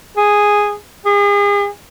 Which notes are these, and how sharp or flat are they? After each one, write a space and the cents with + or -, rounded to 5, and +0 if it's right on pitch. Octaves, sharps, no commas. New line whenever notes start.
G#4 -5
G#4 -40